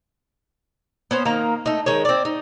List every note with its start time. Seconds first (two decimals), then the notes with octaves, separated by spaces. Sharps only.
1.11 B3 C#4 C5
1.25 D#3 A#3 A#5
1.66 A3 D#4
1.86 D#3 G#3 C#5
2.05 C4 D5
2.25 D#4